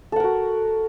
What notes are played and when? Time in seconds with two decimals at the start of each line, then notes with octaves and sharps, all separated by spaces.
0.12 A4
0.16 F#5
0.20 A#4
0.24 F#4